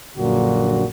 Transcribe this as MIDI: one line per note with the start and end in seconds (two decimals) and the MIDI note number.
0.18 0.84 34
0.18 0.84 42
0.18 0.84 46
0.18 0.84 50
0.18 0.84 54
0.18 0.84 66